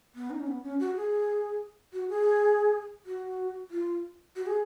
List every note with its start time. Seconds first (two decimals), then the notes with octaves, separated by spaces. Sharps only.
0.15 B3
0.30 D#4
0.40 C#4
0.47 B3
0.63 C#4
0.80 F#4
0.96 G#4
1.93 F#4
2.09 G#4
3.06 F#4
3.71 F4
4.36 F#4
4.47 G#4